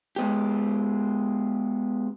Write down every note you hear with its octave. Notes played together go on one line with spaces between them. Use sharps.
G#3 B3 G4